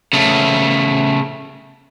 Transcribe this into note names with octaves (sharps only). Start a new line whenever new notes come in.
C#3 A3